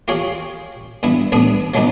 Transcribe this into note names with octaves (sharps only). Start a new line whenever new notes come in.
F4 G4 G#4 C#5 F5
G2 B3 E4
A1 G2 B3 D4 D#6
F3 F#3 G#3 B3 D4 D#4